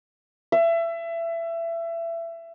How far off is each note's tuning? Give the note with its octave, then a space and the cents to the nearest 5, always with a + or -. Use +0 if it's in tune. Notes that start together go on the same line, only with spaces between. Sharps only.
E5 +25